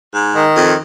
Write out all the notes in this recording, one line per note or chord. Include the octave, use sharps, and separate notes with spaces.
G#2
D#3
F2